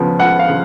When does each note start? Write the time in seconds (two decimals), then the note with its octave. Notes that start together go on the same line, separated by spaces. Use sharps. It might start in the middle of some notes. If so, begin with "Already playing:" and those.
Already playing: C#2 C#3 F3 B3
0.19 C#2 F#5
0.39 F5
0.49 C#3 F3